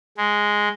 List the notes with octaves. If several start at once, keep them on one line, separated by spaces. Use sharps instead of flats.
G#3